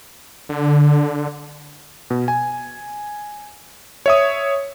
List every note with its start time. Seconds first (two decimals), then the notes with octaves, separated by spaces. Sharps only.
0.49 D3
2.10 B2
2.28 G#5
4.06 C#5 E5 D#6